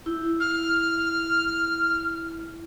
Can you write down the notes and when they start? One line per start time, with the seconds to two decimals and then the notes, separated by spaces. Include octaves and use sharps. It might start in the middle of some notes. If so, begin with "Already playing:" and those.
0.06 E4
0.40 F6